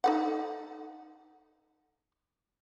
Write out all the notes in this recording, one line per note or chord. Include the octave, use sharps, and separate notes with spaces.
D#4 A4 F#5